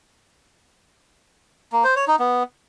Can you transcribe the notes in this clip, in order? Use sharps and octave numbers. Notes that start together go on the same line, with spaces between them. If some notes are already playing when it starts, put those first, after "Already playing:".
A#3
C5
C#5
D#4
B3